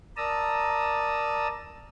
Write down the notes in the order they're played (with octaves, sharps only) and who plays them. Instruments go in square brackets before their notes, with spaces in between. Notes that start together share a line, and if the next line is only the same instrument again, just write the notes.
[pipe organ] A#4 D5 A5 A#5 D#6 E6